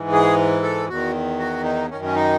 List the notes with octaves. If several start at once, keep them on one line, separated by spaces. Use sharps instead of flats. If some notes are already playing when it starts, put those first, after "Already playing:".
Already playing: G#2 E3
G#4
A4
E2 D#3 F#4
F#4
D#4
F#2 D#3 C#4
C#4
D#4